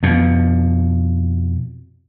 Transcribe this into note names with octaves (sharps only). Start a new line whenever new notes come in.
F2 B2